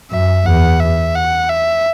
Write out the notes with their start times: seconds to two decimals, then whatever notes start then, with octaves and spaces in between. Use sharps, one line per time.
0.11 F#2 E5
0.46 E2 F#5
0.80 E5
1.15 F#5
1.49 E5